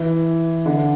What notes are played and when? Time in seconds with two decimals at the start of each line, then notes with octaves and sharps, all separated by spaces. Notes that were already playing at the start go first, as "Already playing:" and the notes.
Already playing: E3
0.66 D3